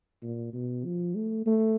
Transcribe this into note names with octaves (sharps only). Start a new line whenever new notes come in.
A#2
B2
F3
A3
A3